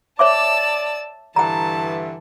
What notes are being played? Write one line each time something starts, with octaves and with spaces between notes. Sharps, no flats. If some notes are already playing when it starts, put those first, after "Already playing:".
C#5 D5 E5 A5 D6 E6
G2 D3 E3 G5 A5 A#5